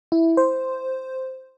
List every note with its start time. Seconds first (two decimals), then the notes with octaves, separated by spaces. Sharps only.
0.12 E4
0.37 C5